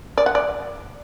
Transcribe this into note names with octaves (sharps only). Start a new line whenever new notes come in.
D5
F#5
D5